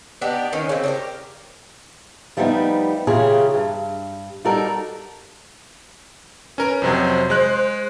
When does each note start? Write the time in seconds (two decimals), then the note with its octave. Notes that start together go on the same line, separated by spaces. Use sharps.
0.21 B3 D4 D#4 G4
0.53 D#3 C#4
0.69 C#3 C4
0.84 D4 G4 A#4
2.37 F3 G3 A3 B3 C4 D#4
3.07 A#2 C#3 E3 F4 G4 G#4
3.54 G2
4.44 G3 D#4 F#4 A4 A#4 D5
6.58 C#4 A#4 B4
6.82 F2 C3 F#3 C5
7.30 G#3 F#6